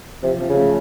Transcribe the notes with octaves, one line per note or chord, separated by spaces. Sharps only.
C3 F3
F3
C#3
A3